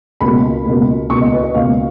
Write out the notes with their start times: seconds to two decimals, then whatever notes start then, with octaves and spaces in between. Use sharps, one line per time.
0.21 C#2 B2 A#3 B5
0.65 C#2 B2 A#3
1.10 C#2 B2 A#3 C#6
1.21 D#5
1.33 B4
1.43 D#5
1.54 C#2 B2 A#3 F5